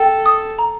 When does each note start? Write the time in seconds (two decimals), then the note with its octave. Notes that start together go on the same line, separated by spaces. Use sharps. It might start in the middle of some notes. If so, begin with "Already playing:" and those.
Already playing: A4 G5
0.26 D#6
0.59 A#5